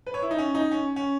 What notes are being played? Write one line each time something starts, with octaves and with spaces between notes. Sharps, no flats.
B4
C#5
E4
D#4
C#4
D#4
C#4
C#4